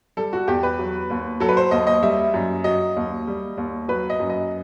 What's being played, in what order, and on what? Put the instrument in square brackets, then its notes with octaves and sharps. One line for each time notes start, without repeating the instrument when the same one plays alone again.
[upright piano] G3 A4
F#4
E2 G4
B4
F#3
D#2
F#3 A4
B4
C5
D#2 D#5
D#5
G3 E5
F#2
F#3 D#5
D#2
G3
D#2
F#3 B4
D#5
F#2
D#5